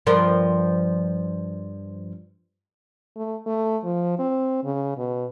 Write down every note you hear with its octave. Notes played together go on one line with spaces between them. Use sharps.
G2 F3 A#4
A3
A3
F3
C4
C#3
B2